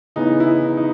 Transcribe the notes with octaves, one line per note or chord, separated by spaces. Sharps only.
C#3 E3 B3 D#4
E4
D#4
D#4